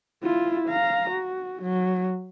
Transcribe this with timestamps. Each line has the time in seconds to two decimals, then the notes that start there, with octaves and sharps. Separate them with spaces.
0.23 E4 F4
0.69 F5 A#5
1.10 F#4
1.62 F#3